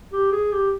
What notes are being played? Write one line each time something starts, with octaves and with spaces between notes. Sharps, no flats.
G4
G#4
G4